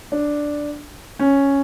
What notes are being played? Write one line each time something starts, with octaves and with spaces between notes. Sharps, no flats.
D4
C#4